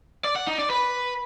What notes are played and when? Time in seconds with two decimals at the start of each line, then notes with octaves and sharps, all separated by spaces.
0.24 D5
0.36 F#5
0.47 D#4
0.59 D5
0.70 B4